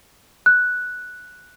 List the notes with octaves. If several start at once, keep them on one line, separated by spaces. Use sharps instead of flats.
F#6